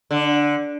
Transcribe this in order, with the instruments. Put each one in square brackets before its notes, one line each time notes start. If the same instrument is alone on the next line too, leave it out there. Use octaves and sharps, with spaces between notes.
[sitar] D3